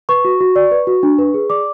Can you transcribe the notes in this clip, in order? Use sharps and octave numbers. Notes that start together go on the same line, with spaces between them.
B4 C#6
F#4
F#4
D5
B4
F#4
D4
B4
G#4
D5 D6